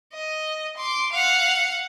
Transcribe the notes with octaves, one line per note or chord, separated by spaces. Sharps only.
D#5
C6 D6
F5 F#5